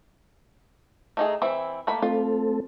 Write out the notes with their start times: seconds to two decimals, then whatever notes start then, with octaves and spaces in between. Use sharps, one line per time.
1.17 A3 D#4 G#4
1.42 E3 C4 E4
1.87 A3 A#3 B5
2.02 A3 C4 F4 A4